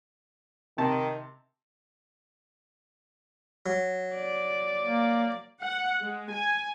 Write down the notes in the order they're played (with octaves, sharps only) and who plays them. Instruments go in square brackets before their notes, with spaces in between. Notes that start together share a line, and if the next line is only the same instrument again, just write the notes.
[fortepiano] C3 A5 [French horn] D#3
[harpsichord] F#3
[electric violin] D5
[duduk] A#3
[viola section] F#5
G#3
G#5